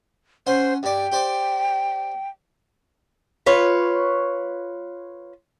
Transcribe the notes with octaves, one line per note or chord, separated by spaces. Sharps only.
C#4 C5 F#5 C6
G2 D5 G5
G4 C5 D5
F4 B4 C#5